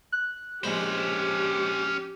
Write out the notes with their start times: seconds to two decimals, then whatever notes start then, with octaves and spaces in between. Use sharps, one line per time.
0.12 F#6
0.64 A#1 G#3 C#4 G4 C5 B5